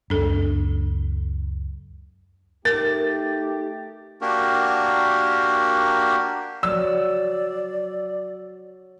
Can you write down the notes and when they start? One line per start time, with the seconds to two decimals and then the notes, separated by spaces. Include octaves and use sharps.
0.10 C#2 F#2 D4 A4
2.65 A3 D#4 G4 A#4 A6
4.21 A#3 D4 F#4 G4 A#4
6.63 F#3 D5 E6